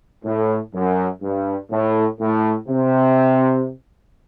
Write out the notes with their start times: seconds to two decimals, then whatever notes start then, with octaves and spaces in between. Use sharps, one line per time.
0.24 A2
0.73 F#2
1.22 G2
1.71 A2
2.20 A2
2.69 C3